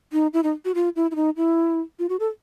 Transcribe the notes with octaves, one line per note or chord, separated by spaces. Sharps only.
D#4
E4
D#4
F#4
F4
E4
E4
D#4
E4
F4
F#4
A4